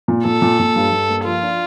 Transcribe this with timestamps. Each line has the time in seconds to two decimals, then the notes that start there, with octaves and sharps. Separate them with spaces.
0.08 A#2
0.25 A#2 A4
0.42 A#2
0.59 A#2
0.76 G2
0.92 G2
1.09 A#3
1.25 F3 F4
1.42 D4